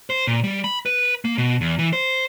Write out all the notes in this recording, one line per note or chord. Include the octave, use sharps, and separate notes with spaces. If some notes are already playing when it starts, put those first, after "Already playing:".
C5
A#2
G3
B5
B4
A#3
B2
E2
E3
C5